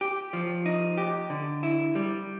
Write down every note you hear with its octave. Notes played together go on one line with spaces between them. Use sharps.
G4
F3
D#4
G4
D3
E4
G3